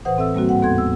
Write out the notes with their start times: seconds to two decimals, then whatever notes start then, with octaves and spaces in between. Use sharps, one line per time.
0.05 A2 E3 B4 C5 F#5 D#6
0.18 C4 A4 E5 F#5 E6
0.35 G3 A#3 C4 F#4
0.48 G#2 F#5 G5
0.62 D#2 B3 A4 F#5 C6 G#6
0.78 E6